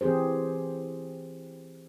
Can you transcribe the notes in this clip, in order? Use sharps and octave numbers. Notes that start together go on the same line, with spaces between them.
E3 C4 G4 G#4 C5